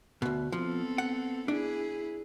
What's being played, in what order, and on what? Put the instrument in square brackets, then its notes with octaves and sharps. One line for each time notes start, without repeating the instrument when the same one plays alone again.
[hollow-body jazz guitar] D2 B2
[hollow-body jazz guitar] F3 [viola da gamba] B3 C4 A4
[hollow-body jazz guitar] F#5
[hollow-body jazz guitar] D4 [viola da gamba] E4 G#4